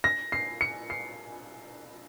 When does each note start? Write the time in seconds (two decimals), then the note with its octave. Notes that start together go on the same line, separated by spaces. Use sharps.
0.04 A#6
0.32 C7
0.61 C#7
0.90 C7